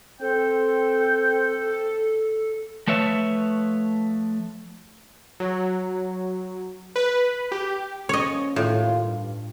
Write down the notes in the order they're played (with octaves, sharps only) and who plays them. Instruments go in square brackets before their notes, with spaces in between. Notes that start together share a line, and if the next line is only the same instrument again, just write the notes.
[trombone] C4 [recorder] A4 [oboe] G5
[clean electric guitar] F3 A3 B4 C#5 E5
[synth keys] F#3
B4
G4
[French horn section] F3 A#3 C#4 [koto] C#5 D#5
[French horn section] D#2 F4 [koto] A2
[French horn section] G2